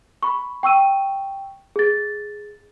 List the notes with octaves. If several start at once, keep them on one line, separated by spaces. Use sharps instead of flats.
B5 C#6
G5 C#6 E6 D#7
G#4 A6